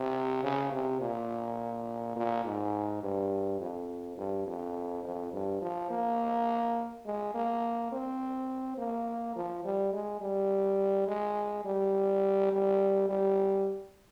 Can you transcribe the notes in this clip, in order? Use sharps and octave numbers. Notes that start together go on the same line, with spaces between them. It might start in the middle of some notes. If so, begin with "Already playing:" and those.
Already playing: C3
C#3
C3
A#2
A#2
G#2
G2
F2
G2
F2
F2
G2
F3
A#3
G#3
A#3
C4
A#3
F3
G3
G#3
G3
G#3
G3
G3
G3